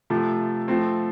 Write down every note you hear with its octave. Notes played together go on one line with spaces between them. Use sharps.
C3 F3 A3
F3 A3 C4